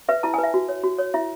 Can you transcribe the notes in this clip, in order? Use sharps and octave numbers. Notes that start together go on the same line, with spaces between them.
B4 E5
E4 A5
G#5
B4
E5
F#4
C#5
F#4
C#5
E4 E5